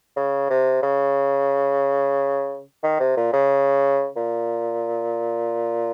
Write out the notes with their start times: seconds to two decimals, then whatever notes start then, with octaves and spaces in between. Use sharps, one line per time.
0.16 C#3
0.50 C3
0.83 C#3
2.83 D#3
3.00 C3
3.17 A#2
3.33 C#3
4.16 A#2